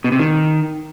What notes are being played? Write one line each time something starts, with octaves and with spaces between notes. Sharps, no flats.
B2
C3
D#3